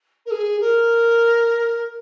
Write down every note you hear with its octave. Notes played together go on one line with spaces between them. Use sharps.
A#4
G#4
A#4